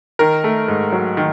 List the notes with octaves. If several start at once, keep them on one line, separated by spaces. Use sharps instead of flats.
D#3 A#4
A3
G#2
F#3
D#3